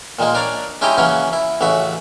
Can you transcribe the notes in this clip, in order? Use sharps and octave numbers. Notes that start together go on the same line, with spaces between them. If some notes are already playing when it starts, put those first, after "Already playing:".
A#2 D#3 G#3 A#3
D4 A#4 C#5 D5
G#3 C#4 D#4 E4 G4 D#5
C#3 E3 F#3 A#3 C#4
E4
A1 C#3 F#4 E5